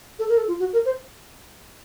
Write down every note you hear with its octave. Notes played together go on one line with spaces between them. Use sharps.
A4
A#4
A4
F4
F#4
A#4
C5